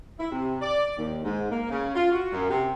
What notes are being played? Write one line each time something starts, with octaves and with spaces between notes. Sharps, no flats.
E4
C3
D5
D#2
G#2
A#3
C#3
F4
F#4
F#2
C3